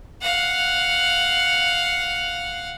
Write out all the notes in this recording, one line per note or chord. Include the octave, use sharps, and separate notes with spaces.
F5 F#5